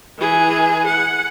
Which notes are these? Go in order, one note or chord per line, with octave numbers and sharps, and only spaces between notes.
E3 G#4
F#5